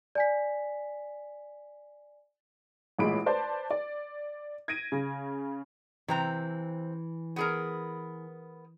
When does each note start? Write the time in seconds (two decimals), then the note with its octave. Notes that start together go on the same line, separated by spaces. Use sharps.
0.15 D5 G#5 B6
2.99 A1 A#2 G#3 B5 D7
3.26 B4 C5 D5 A5
3.71 D5
4.68 G#6 A#6 D7 D#7
4.92 C#3
6.08 C3 E3 C4 A#5
7.36 B3 G#4 A#4